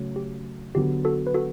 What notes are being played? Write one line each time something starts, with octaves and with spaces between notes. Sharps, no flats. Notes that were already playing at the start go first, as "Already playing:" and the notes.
Already playing: C#3 F#3 A3 C#4
G4
D3 F#3 B3 G4
F#4 A4
B4
F#4 A4